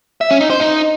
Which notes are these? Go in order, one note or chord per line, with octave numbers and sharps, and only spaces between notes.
E5
C#4
D#4
C5
D#4